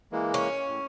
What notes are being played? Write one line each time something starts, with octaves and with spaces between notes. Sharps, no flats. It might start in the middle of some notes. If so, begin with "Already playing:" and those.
E3 G#3 A#3
C#4
A2